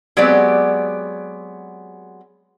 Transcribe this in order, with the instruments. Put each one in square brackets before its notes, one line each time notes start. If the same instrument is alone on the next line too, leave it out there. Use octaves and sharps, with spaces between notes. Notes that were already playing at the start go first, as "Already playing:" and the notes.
[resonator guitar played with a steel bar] F#3 G#3 B3 C4 G4 D5